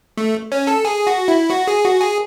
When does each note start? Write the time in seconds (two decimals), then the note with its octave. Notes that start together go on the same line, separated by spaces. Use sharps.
0.17 A3
0.52 C#4
0.67 A4
0.85 G#4
1.07 F#4
1.28 E4
1.50 F#4
1.67 G#4
1.84 F#4
2.00 G#4